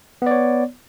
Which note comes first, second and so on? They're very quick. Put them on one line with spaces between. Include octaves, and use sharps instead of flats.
B3 D5 C#5